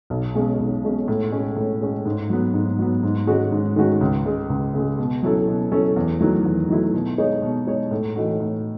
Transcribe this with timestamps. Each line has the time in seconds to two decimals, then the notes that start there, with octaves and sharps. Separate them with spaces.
0.10 B1
0.35 B2 G#3 C#4
0.60 B1
0.84 B2 G#3 C#4
1.08 A2
1.32 G#3 C#4
1.57 A2
1.81 G#3 C#4
2.06 G#2
2.30 F#3 B3
2.54 G#2
2.79 F#3 B3
3.03 G#2
3.27 D#3 G#3 C#4 F#4
3.52 G#2
3.76 D#3 G#3 C#4 F#4
4.01 C#2
4.25 C#3 G#3
4.50 C#2
4.74 C#3 G#3
4.99 B2
5.23 F#3 C#4 E4 A4
5.47 B2
5.72 F#3 C#4 E4 A4
5.96 E2
6.20 D#3 F#3 A3 E4
6.45 E2
6.69 D#3 F#3 A3 E4
6.94 B2
7.18 G#3 D#4 G#4 C#5
7.42 B2
7.67 G#3 D#4 G#4 C#5
7.91 A2
8.16 E3 A3 D#4 F#4
8.40 A2